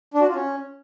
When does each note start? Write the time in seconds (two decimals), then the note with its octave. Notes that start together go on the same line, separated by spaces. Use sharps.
0.14 D4
0.21 F#4
0.28 F4
0.35 C#4